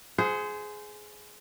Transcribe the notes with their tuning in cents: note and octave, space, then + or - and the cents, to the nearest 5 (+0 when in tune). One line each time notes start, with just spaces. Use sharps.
G#4 +15 C5 -20 F#5 +0